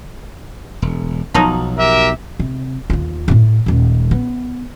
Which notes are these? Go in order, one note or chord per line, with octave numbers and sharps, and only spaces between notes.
E1
B1 F3 F#3 D#4
G4 A#4 E5
C3
D#2 F4
A1 A2
D#1 G#3
B3